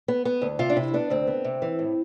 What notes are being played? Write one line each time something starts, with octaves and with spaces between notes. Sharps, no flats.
B3
B3
D2
C3 F4
D4
C3 E4
B3 D4
D2 C4
B3
C3
E3
A2